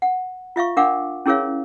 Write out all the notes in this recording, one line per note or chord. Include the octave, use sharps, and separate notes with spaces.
F#5
F4 E5 F5 C#6
D4 A#4 F5 F#5 D6
C#4 E4 G#4 A#4 C#5 F5